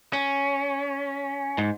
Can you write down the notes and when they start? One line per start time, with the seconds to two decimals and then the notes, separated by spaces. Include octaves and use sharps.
0.13 C#4
1.58 G#2